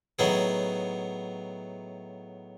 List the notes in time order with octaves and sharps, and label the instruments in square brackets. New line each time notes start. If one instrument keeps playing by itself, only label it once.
[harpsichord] A2 F#3 B3 D#4 G#4